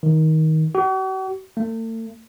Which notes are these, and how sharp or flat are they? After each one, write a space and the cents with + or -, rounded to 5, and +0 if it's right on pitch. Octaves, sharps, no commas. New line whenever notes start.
D#3 +20
F#4 +45
A3 +40